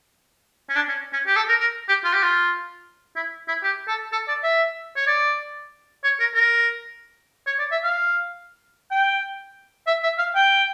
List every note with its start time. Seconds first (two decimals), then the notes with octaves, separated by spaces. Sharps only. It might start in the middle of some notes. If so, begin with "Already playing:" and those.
0.69 C#4
0.76 D4
0.88 C#4
1.13 C#4
1.27 G4
1.36 A4
1.49 A#4
1.60 A#4
1.89 G4
2.04 F4
2.13 G4
2.23 F4
3.16 E4
3.48 E4
3.63 G4
3.87 A4
4.12 A4
4.28 D5
4.43 E5
4.96 C#5
5.07 D5
6.04 C#5
6.20 A#4
6.35 A#4
7.46 C#5
7.59 D5
7.71 E5
7.84 F5
8.91 G5
9.87 E5
10.03 E5
10.18 F5
10.35 G5